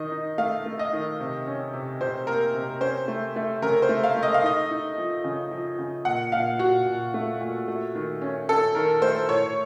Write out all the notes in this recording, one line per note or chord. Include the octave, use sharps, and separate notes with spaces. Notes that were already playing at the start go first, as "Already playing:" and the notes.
Already playing: D#3 D#4 D#5
D#4
A3 F5
A3
D#5
D#3
C3
C#4
C3
C3 C5
A#3 A#4
C3
C#4 C5
A3
A3
C#3 A#4
C5
A3
F5
A3
D#5
F5
D#4 D#5
D#4
F3
C#3
F3
C#3
A#2 F#5
A#2 F5
A#2 F#4
A#2
A3
A#2
A3
D#3
C#4
C#4 A4
D#3 A#4
A3 C5
A2 C#5